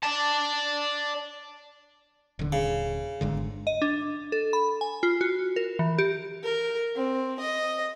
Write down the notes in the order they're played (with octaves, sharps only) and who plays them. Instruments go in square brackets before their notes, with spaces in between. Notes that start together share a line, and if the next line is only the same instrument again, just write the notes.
[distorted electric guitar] D5 A5
[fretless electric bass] D#1 D3
[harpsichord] C#3
[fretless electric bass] G1 G#2 D3
[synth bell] D#5
D4
A4
B5
G#5
F4
F#4
A#4
E3
G4
[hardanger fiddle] A#4
C4
D#5